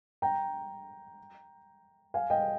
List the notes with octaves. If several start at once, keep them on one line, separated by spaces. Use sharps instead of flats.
G5 A#5
F5 G#5
D#5 G5